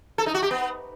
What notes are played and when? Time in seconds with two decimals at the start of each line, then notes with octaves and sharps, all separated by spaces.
0.18 A4
0.26 D#4
0.34 F#4
0.43 G4
0.51 B3